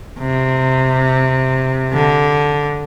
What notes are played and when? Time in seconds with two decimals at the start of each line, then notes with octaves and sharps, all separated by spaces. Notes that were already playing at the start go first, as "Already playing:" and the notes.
0.20 C3
1.93 D3